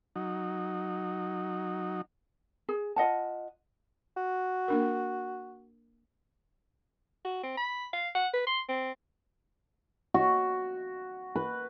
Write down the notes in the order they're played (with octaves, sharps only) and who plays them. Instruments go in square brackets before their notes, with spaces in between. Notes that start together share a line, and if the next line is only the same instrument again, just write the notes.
[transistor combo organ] F#3 D#4
[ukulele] G#4
F4 D#5 F#5 A5
[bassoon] F#4
[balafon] A#3 D4 A#4
[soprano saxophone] F#4
C4
B5
F5
F#5
B4
C6
C4
[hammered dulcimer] F#4
B4